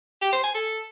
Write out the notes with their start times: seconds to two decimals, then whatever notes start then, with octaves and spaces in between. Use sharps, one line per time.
0.21 G4
0.32 C5
0.43 G#5
0.54 A4